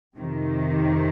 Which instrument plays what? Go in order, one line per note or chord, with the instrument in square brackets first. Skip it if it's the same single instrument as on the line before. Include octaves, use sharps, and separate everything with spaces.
[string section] F2 C3 D#3